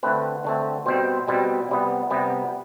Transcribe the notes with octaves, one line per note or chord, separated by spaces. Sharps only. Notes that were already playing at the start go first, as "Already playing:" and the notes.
D3 A3 C4 B4
D3 A3 C4
B2 G3 C4 C5
B2 G3 C4
C3 G3 B3
C3 G3 B3